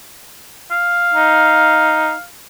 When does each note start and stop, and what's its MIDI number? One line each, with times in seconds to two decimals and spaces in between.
0.71 2.23 77
1.14 2.13 63